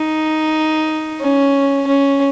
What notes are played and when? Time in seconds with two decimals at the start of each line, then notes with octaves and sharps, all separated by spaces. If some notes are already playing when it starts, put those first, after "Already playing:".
Already playing: D#4
1.21 C#4
1.87 C#4